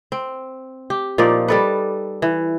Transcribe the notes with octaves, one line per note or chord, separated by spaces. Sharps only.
C4
G4
A#2 F3 D#4 D5
G3 A4 B4
E3